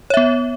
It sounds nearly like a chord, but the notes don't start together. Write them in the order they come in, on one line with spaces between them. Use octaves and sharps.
C#5 E5 B3